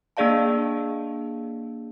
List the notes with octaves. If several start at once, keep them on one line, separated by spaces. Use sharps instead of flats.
A#3 D4 G#4 D5 F5 A5